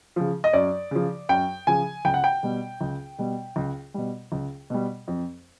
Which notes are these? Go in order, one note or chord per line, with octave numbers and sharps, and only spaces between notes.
C#3 F3
D#5
F#2 D5
C#3 F3
F#2 G5
C#3 F3 G#5
C#2 G5
F#5
G5
B2 G3
C#2
B2 G3
C#2
B2 G3
C#2
B2 G3
F2